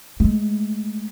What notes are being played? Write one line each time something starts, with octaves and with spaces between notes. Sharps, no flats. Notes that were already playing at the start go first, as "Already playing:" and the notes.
G#3 A3